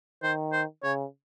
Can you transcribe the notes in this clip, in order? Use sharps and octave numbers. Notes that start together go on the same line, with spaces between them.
D#3 C5
C5
C#3 C#5